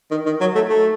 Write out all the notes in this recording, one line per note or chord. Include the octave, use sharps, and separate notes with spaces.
D#3
D#3
F#3
A3
A3